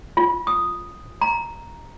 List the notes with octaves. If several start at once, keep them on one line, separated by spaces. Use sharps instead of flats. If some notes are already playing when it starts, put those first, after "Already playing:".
F4
D#6
A#5